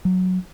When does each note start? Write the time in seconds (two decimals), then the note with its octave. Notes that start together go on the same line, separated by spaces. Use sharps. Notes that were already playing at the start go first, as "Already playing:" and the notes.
0.05 F#3